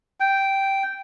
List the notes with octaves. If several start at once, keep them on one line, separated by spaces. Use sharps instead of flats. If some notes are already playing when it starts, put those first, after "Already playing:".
G5